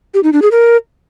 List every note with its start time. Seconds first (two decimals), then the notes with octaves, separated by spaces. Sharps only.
0.14 G4
0.23 D#4
0.33 D4
0.42 G#4
0.51 A#4